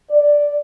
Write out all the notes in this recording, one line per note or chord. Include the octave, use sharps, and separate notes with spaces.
D5